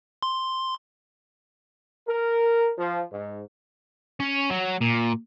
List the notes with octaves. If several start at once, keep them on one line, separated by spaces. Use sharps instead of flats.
C6
A#4
F3
G#2
C#4
F#3
A#2